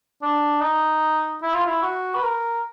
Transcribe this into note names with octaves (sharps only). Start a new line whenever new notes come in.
D4
D#4
E4
F4
E4
F#4
B4
A#4